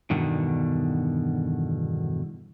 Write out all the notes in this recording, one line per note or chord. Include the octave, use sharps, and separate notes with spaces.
E2 G2 B2 D3 D#3